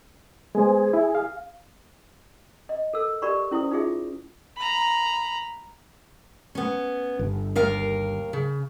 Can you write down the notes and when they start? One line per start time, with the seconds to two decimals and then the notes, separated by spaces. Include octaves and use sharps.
0.55 G#3 B3 G#4 C5
0.93 E4
1.15 F5
2.69 D#5
2.93 A4 A#4 E6
3.22 G4 A#4 D5 B5 C#6
3.51 C#4 E4 C5 D#6
3.71 D#4 F4 G#4 E5
4.56 A#5 B5
6.55 B3 C#4
7.19 G1
7.56 D#2 A#4 F5
8.33 C#3